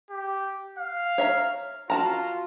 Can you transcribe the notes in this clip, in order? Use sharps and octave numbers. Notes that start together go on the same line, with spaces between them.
G4
F5
C#5 E5 A#5
F4 F#4 A5 A#5